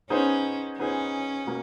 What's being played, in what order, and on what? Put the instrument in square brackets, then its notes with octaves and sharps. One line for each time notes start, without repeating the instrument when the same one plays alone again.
[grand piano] B3 D#4 G#4 C5 [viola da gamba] C#4
[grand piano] B3 D#4 G#4 C5 [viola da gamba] C#4
[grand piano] B2 A#3